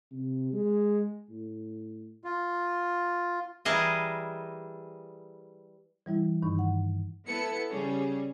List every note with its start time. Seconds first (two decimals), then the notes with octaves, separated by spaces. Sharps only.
0.12 C3
0.53 G#3
1.29 A2
2.24 F4
3.65 E3 G3 G#4 A#4 D5 D#5
6.06 E3 G3 E4
6.43 G2 D#3 D#4 C#6
6.59 F#5
7.26 B3 E4 A4 B4 C#7
7.71 C#3 G3 C#4 G#4